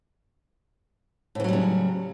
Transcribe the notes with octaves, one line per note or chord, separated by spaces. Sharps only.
A2 C#3 E3 F#3 G3